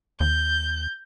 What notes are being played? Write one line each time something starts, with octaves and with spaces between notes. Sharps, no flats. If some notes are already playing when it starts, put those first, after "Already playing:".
D#2 G6